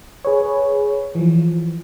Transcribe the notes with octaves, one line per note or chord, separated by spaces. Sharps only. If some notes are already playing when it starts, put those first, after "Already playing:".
G#4 B4 C#5
E3 F3